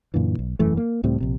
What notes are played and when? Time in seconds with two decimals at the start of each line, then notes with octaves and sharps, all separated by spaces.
0.14 F#2 A#2 D3 E3
0.39 B1
0.59 E1 F#2 E3 A3
0.77 A#3
1.03 C#2 A2 G3 C4
1.20 A#1 C3